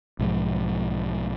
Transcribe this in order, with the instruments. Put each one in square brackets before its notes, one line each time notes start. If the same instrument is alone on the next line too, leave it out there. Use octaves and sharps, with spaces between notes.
[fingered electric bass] B1 G#2 F3